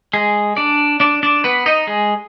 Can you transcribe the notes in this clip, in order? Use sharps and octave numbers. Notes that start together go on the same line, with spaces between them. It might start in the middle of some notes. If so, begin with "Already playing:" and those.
G#3 G#4
D4 D5
D4 D5
D4 D5
B3 B4
D#4 D#5
G#3 G#4